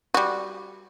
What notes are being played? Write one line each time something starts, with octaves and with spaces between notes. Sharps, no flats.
G3 F#4